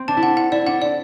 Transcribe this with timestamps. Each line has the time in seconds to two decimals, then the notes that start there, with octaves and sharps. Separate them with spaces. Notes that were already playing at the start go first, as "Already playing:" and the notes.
Already playing: C4
0.08 D4 A5
0.17 E4
0.23 D4 F#5
0.37 F#5
0.52 E4 D5
0.67 D4 F#5
0.82 E4 D5